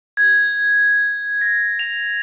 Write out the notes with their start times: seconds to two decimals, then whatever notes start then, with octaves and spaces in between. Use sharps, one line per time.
0.17 G#6
1.41 A#6
1.79 F7